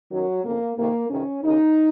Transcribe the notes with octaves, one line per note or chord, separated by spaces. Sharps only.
F#2 D#3 F#3
F2 C#3 A#3
F2 C3 D#3 A#3
F2 C3 D#3 C#4
D#2 C#3 D#4